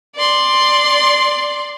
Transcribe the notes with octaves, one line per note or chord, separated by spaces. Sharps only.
D5 C6